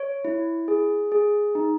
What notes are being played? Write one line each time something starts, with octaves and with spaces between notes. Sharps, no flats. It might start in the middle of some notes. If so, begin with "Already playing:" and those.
Already playing: C#5
E4
G#4
G#4
D#4